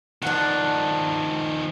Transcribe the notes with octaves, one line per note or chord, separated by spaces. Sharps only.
D#3 F3 D4 F#5